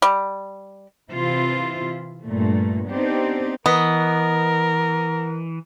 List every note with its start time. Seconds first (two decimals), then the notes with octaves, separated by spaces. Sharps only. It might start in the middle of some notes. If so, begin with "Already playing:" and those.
0.02 G3
1.11 C3 E3 E4 F4
2.24 G2 A#2 A3
2.87 B3 C4 D4 D#4 G4
3.66 E3 B3 A#4 D#5